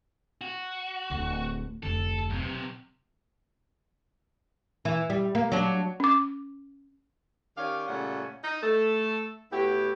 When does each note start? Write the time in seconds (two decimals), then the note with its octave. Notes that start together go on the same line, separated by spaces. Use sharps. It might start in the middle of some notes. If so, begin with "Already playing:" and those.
0.41 F#4
1.10 D1 D3
1.83 F1 D2 A4
2.30 B1 C3
4.85 E3
5.10 G3
5.35 A#3
5.52 F#3 D4
6.00 C#4 D6
7.58 D#3 C#4 G4 C#5 D5 F5
7.88 A#2 C#3 G3 A3 C#4 F#5
8.44 D#4
8.63 A3 A4
9.52 A2 B3 E4 F#4 G4